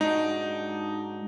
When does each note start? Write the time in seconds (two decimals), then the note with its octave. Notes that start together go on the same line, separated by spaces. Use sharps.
0.01 G#2 D4 D#4 F#4